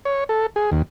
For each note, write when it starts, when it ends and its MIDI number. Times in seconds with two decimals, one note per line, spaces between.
0.05 0.24 73
0.29 0.46 69
0.56 0.70 68
0.72 0.82 39